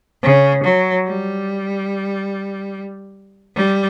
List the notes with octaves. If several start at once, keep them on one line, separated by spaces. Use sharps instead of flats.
C#3
F#3
G3
G3